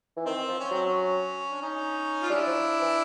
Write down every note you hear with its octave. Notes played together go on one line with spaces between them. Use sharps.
E3
D#3 C4
F3
C#4
F#3 C4
C#4
D4
C#4 D#4
F4
G3 D4 E4
F3
E3